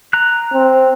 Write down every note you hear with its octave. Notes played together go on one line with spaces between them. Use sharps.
A#5 F#6
C4